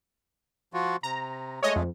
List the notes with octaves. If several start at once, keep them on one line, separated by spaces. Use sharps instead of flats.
F3 F4 F#4
C3 A#5
G#3 A3 C#5 D#5
F2